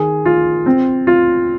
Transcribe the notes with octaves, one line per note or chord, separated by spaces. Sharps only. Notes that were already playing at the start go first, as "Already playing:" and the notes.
Already playing: D#3 G#4
F4
C4
F4